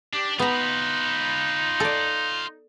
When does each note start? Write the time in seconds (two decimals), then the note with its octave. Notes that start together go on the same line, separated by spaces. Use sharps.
0.14 D4 G4
0.39 B3 D#4 F4 B4 A#5
1.80 A4 D5